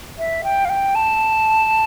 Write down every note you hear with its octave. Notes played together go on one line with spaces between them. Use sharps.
E5
G5
F5
G5
A5